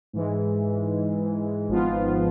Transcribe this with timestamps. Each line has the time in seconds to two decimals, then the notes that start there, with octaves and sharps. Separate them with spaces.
0.13 G#2 E3 G#3
1.69 G#1 G#2 F3 B3 F4